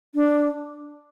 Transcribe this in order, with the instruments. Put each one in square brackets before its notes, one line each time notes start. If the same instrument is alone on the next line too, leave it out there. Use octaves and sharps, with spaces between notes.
[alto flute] D4